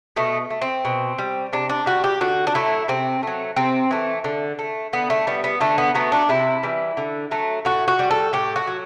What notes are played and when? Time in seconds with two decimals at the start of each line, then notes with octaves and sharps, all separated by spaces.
0.16 B2 A3
0.50 A3
0.62 C4
0.85 B2
1.18 G3
1.53 C3 D4
1.69 D4
1.86 G3 F#4
2.04 G4
2.21 D3 F#4
2.47 D4
2.54 F#3 A3 E4
2.88 C3 C4
3.23 F#3 A3
3.56 C3 C4
3.91 E3 A3
4.24 D3
4.59 A3
4.93 D3 B3
5.10 A3
5.27 G3 B3
5.44 B3
5.61 D3 A3
5.78 B3
5.95 F#3 A3 B3
6.12 D4
6.29 C3 E4
6.63 E3 G3
6.97 D3
7.31 F#3 A3
7.65 A2 F#4
7.88 F#4
7.99 G3
8.11 A4
8.33 A2 G4
8.56 F#4
8.67 F#3